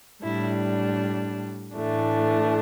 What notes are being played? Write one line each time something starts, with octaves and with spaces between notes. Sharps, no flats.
A2 G3 D4 E4
A2 E3 A3 D4